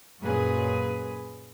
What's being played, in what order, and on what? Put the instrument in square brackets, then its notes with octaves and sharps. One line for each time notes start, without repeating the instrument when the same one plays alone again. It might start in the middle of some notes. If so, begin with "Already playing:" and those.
[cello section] F#2 A#2 G#4 B4